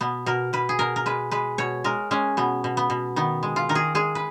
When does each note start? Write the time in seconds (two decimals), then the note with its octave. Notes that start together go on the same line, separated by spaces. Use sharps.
0.01 B2 B3
0.26 B2 A#4
0.53 B2 B4
0.69 G#4
0.79 B2 A#4
0.96 A#4
1.06 G#3 B4
1.31 G#3 B4
1.58 B2 C#5
1.84 G#3 A#4
2.11 G#3 C#4
2.37 B2 B3
2.64 B2
2.77 B3
2.90 B2
3.16 D#3 B3
3.43 G#3
3.56 F4
3.69 D#3 A#4
3.75 G#4
3.95 G#3 G#4
4.15 B4